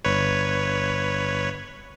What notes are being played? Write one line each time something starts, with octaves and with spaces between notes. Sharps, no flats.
G1 B4 C#5